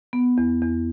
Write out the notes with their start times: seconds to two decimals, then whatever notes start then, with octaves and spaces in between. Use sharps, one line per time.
0.13 B3
0.38 E2
0.62 E2